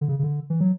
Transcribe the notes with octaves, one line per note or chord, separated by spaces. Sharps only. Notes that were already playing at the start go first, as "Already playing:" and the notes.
D3
C#3
C#3
D3
E3
F#3